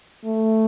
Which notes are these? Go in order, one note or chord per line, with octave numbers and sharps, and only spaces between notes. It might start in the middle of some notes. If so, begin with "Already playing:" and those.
A3